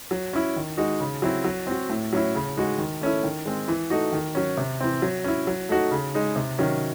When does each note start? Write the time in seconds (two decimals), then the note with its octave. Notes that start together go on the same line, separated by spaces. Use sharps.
0.11 F#3
0.33 C#4 E4
0.56 D#3
0.77 G#3 D#4 F#4
1.00 C#3
1.22 F#3 C4 E4
1.44 F#3
1.67 C4 F#4
1.90 A2
2.13 F#3 C#4 E4
2.35 C#3
2.57 G#3 D#4 F#4
2.78 D#3
3.01 A3 C#4 E4
3.24 D#3
3.45 G#3 C4
3.68 E3
3.90 A3 D#4 F#4
4.13 D#3
4.35 F#3 C#4
4.57 C3
4.81 E3 C4
5.02 F#3
5.24 C#4 E4
5.47 F#3
5.69 A3 D#4 F#4
5.91 C#3
6.14 G#3 D#4
6.36 C3
6.59 D#3 F#3 C#4